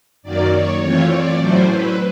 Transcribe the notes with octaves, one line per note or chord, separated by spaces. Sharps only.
F#2 D#3 F#3 A#3 D5
C#5
E3 A3 C4 F4 C#5
D5
A2 F#3 A3 C#4 E4 C5
B4